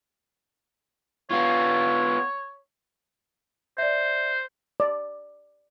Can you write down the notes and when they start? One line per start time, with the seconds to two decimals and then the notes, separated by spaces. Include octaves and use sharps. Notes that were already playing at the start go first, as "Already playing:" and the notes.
1.31 B3 F4 C#5
3.78 C5 D5 E5
4.80 D5